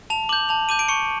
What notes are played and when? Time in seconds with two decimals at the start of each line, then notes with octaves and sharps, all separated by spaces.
0.10 A5 F7
0.29 D6 G6 F#7
0.49 A5 F7
0.69 D6 G6 D#7
0.79 D7
0.89 C#6 C#7